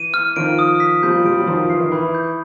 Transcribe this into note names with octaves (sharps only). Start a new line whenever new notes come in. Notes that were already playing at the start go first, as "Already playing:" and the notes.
Already playing: E3 D#7
F6
D#3 F3 D7
D#6
B6
F3 G3 G6
F3 G3 D7
F#3
D#3 F3 D#6
E3 C7
D#3
E3 B5
G6